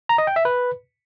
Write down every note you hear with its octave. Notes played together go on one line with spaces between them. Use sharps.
A#5
D#5
G5
E5
B4